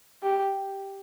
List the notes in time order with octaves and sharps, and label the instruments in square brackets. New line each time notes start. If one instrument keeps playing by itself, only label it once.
[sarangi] G4